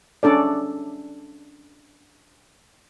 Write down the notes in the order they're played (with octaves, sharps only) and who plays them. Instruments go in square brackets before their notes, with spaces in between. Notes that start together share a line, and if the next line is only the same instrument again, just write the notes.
[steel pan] C#4 D4 A4 D5